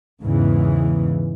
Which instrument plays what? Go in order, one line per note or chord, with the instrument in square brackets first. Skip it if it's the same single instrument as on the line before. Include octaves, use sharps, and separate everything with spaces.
[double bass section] E2 G#2 C#3 E3